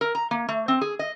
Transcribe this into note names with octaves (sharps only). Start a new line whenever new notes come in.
A#4
A#5
A#3
A3
C4
G#4
D#5